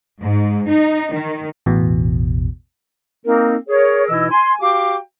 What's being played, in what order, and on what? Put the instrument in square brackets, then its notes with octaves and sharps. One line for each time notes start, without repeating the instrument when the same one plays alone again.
[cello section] G#2
D#4
D#3
[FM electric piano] A1 E2 B2
[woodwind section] A#3 C4 D#4 A#4
G#4 A#4 C#5
B2 E3 D#4 E4 D#5 E6
G#5 C6
F#4 G4 F5 G5 D6